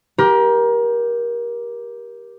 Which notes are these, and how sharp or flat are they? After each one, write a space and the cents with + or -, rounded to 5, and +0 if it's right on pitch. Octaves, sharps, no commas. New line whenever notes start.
G4 +0 A#4 +25